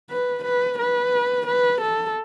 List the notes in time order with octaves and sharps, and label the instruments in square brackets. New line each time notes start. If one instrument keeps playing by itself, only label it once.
[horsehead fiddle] B4
B4
B4
B4
A4